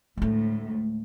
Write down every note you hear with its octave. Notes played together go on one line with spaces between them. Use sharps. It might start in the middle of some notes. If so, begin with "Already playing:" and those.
D2 A2 G#3 A3